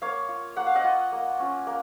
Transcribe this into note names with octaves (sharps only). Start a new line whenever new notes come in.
A#3 C#5 F5
F4
A#3 F#5
F5
D#5 F#5
F4
A#3
C#4 F4
A#3